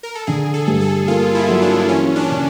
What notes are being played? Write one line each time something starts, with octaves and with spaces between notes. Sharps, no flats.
A#4
A4
D3 G#4
A4
G2
A4
A#3 F4
E4
F#3
D4
E3 C#4
D4
C#3